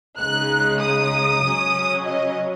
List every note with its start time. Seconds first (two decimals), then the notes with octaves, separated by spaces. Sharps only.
0.19 C#2 C#3 G#3 D#4 F#6
0.82 D#6
1.44 C#3 F#3 C#4
2.05 D#5